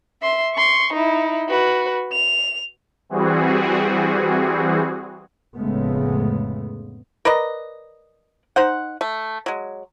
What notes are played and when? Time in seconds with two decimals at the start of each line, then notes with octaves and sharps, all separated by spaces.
0.22 E5 C6
0.54 C6 C#6
0.93 D#4 E4
1.49 F#4 B4
2.13 F7
3.09 E3 G3 C4 F#4 G#4
5.56 F1 A2 C#3 G#3 A3 B3
7.25 A#4 B4 D5 D#5
8.56 D#4 C5 F#5
9.01 A3
9.46 F#3 G#3